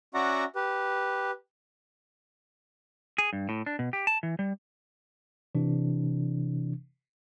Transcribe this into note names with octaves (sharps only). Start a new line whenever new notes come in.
C#4 F#4 D5 E5 F#5 A#5
G4 B4
G#4
G2
A2
D4
B2
G4
A5
E3
G3
C3 E3 D4